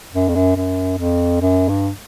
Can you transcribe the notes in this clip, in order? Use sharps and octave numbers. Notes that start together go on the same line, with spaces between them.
F#2
F2
F#2
F#2
F2
F#2
G2